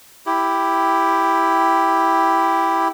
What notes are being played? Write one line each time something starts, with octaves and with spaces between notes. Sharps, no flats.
E4 G4